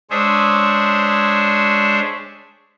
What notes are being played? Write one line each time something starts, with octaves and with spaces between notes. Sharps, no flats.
G#3 D4 G#4 C5 C#5 E5